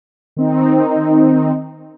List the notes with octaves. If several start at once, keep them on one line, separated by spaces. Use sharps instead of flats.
D#3 C4 D#4